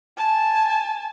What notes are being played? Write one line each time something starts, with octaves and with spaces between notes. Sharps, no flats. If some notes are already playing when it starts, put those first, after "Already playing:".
G#5 A5